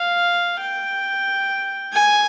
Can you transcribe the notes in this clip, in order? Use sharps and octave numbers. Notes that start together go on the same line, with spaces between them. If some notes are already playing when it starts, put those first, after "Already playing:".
Already playing: F5
G5
G#5